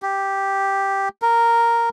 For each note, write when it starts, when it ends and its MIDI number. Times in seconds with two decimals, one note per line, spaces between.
0.02 1.09 67
1.22 1.89 70